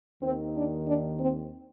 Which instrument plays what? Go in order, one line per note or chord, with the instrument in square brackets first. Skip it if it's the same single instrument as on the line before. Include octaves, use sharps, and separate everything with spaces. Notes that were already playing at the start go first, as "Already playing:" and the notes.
[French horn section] D#2 D#3 C4
D4
D4
C4